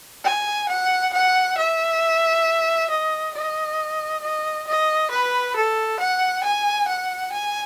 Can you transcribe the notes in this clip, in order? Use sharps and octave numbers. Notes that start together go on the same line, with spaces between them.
G#5
F#5
F#5
E5
D#5
D#5
D#5
D#5
B4
A4
F#5
G#5
F#5
G#5